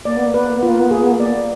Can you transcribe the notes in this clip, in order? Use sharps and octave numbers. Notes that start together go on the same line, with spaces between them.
A#3 D5
B3
A#3
B3 B4
A#3
B3 F4
A#3
B3
A#3 G#4
B3
A#3
D5